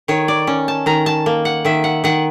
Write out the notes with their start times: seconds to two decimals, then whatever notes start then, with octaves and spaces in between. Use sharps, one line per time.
0.08 D#3 C#5
0.28 D5
0.47 C#4
0.68 A5
0.86 D#3 A#5
1.06 A5
1.26 A#3
1.45 F#5
1.65 D#3 E5
1.84 F#5
2.04 D#3 F#5